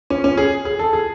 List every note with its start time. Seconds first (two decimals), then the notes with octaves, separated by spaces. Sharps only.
0.10 C#4
0.24 C#4
0.37 G#4
0.65 G#4
0.79 A4
0.93 G#4